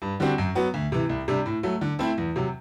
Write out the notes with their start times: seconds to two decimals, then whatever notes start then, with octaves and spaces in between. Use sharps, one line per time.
0.02 G2
0.20 D3 G3 C4 F#4
0.38 F#2
0.55 F#3 B3 F#4
0.74 D2
0.92 C3 E3
1.09 C2
1.28 C3 G3 D4
1.46 A2
1.63 F#3 A3
1.81 D3
1.99 A3 C4 E4
2.18 E2
2.36 C3 F#3